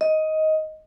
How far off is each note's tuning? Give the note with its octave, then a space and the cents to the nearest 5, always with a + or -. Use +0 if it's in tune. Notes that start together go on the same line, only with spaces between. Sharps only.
D#5 +10